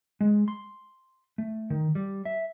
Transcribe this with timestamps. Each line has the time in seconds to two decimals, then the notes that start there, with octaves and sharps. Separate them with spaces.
0.21 G#3
0.48 C6
1.38 A3
1.70 D#3
1.95 G3
2.25 E5